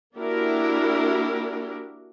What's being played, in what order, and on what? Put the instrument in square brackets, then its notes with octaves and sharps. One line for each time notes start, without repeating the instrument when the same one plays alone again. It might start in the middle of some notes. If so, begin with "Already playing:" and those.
[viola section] A#3 D4 E4 F#4 G4 A#4